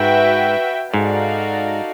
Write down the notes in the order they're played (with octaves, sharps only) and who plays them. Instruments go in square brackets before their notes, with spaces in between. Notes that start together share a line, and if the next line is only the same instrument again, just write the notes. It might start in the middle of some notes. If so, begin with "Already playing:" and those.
Already playing: [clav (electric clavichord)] G#2 [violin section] F#4 B4 E5 G5
[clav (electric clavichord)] G#2 [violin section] D#4 F#4 A4 D5 F5